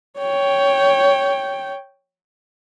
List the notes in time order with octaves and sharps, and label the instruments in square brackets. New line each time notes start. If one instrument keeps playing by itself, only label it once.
[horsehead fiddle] C#5 G5